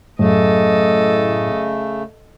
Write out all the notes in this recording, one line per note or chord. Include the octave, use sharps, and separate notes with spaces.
F#2 A2 C#3 F#3 A3 A4 D#5